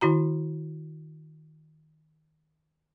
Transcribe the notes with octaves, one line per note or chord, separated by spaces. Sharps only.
D#3 E4 F#4 A#5